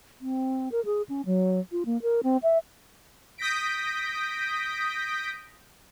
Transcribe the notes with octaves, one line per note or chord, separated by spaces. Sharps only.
C4
A#4
G#4
C#4
F#3
F4
A#3
A#4
C4
E5
D#6 G6 A#6 B6 D7